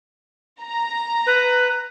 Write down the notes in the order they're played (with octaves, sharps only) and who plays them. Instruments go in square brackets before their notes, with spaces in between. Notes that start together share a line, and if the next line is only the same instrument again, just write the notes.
[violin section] A#5
[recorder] B4